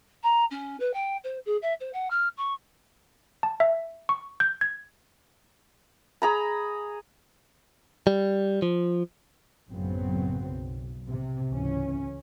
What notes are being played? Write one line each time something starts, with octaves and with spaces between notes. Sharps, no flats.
A#5
C#4
B4
G5
C5
G#4
E5
C5
F#5
F6
C#6
A5
E5
C#6
G6
G#6
G#4 A#5 B5
G3
F3
A1 F#2 C#3 F#3 B3 C4
B1
C3
C#2 G#2 E3 C#4